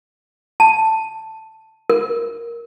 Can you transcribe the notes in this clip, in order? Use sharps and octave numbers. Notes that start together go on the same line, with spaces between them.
A5
A#4